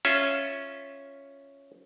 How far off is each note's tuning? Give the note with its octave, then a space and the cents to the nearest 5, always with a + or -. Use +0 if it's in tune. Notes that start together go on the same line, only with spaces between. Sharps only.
C#4 +0 F4 +0 E5 +5